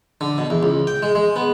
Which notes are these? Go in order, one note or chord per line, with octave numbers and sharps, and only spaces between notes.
D3
B2
E2
C#2
G5
G#3
G#3
B3